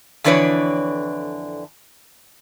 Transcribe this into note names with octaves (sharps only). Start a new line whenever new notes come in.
F2 D3 E3 D4 B4 C#5